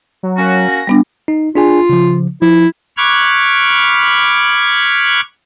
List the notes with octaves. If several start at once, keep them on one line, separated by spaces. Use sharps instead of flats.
F#3
A#3 C#4 F#4
A#6
G3 B3 D4
D#4
D4 F4 G#4 G#5
C#3 F3
F3 E4
B5 C#6 D6 F6 F#6 G#6